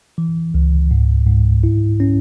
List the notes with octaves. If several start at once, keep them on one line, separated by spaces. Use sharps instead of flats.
E3
C#2
G#2
G#2
E4
C#4